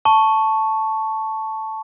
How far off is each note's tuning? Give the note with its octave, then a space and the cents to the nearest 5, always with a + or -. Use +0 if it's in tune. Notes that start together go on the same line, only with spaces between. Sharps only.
A5 +0 C#6 +0